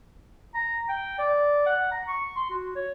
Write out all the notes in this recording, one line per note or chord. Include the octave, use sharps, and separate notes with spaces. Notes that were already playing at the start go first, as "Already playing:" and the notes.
A#5
G5
D5
F#5
A#5
C#6
C6
F#4
C#5